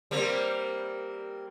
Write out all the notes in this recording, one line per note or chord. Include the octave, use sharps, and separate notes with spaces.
G3 A#3 C4